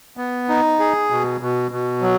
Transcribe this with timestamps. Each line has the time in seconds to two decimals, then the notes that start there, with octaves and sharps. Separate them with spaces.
0.17 B3
0.49 D#4
0.79 G#4
1.10 B2
1.41 B2
1.71 B2
2.02 F#3